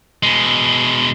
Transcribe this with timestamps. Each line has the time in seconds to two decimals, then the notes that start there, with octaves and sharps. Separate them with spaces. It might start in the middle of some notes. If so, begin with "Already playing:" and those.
0.23 B2 G#3